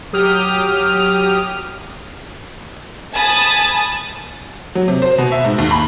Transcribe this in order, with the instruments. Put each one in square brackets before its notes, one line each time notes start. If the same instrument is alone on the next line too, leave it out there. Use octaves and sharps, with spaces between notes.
[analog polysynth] F#3 G4 D#6 F6
[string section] G#5 A5 B5 D#6 A6
[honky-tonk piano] F#3
C3
C5
B2
E5
G#2
D#2
B5